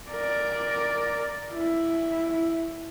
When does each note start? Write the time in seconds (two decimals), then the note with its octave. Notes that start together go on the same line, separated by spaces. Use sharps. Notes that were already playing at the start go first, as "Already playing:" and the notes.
0.11 A#4 D5
1.54 E4